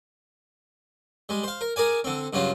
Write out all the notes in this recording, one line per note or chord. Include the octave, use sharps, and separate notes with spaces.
G3 G#3
C5 F5
A#4
G#4 A#4 D5 G#5
D3 C4
G2 C#3 F#3 F4 G4